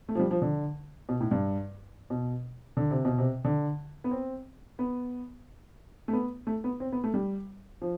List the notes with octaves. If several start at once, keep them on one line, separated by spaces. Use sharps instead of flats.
A3
F3
G3
F3
D3
B2
A2
G2
B2
D3
C3
B2
C3
D3
B3
C4
B3
A3
B3
A3
B3
C4
B3
A3
G3
F3